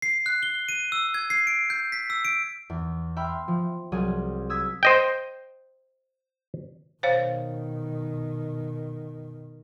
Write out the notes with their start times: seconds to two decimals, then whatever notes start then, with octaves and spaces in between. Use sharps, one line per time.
0.02 C7
0.26 F#6
0.43 G7
0.69 D#7
0.92 E6
1.14 G#6
1.30 C7
1.47 D7
1.70 G6
1.92 B6
2.10 E6
2.25 D7
2.70 E2
3.17 E5 G5 B5 C6 F6
3.48 F3
3.92 C2 F#3 G#4 F6 D#7
4.49 D#6 E6 G#6 B6
4.83 C5 D#5 G5
7.03 B2 D#3 C5 C#5 F5